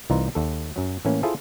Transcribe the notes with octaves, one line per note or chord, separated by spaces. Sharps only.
C2 E3 D#4 F4 A#5
D#2 A4
F#2 F#3
A2 E3 A#3 C#4
E4 F4 G#4 A4 C5